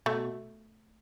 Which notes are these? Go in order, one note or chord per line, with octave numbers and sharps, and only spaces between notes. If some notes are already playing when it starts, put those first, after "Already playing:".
B2 A3